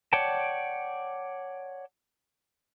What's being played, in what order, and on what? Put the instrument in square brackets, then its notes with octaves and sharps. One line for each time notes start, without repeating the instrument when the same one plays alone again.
[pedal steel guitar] C#5 D5 F#5 G5 A5